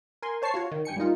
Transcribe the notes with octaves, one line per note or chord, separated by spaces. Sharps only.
A#4 G#5 C6
C5 C#5 A5 C#6 C7
F4 F#4 C#5
D#3
G2 G5 G#5 C#7
G3 A#3 D#4 F4